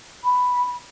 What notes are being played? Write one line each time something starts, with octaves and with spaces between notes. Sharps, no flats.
B5